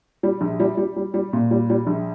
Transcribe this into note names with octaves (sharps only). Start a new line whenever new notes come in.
G3
A#1
G3
G3
G3
G3
A#2
G3
G3
A#1